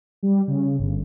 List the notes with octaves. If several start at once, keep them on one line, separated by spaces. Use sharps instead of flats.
G3
C#3
G1